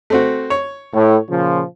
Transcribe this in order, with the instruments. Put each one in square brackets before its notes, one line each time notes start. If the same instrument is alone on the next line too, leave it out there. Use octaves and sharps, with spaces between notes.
[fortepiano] A3 C4 F#4
C#5
[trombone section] A2
A#2 C#3 F3